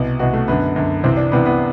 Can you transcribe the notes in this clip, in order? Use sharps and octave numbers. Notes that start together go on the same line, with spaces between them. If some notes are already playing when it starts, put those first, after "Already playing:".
Already playing: C2 B2
C2 B2 F#4
A3
F#2 D3 B3
F#2 D3
C2 C3 E3 C4
D4
C2 C3 E3 B3
B3